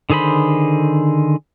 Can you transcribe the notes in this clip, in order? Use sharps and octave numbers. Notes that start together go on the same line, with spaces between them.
D3 D#3 G#4 C5 B5